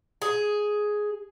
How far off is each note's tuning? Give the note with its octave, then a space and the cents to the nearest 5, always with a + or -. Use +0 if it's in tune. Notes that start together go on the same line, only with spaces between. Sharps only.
G#4 +5